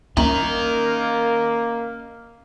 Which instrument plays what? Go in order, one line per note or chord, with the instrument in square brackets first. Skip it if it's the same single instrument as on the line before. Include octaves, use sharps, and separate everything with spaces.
[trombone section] A#3 [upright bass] C#4 [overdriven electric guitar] A#4 D#5 [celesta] E5 A#5 F#7